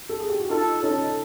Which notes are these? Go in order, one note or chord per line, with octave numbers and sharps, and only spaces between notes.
A4
G#4
G4
F#4
D#4 F4 A4
C#4 D#4 A4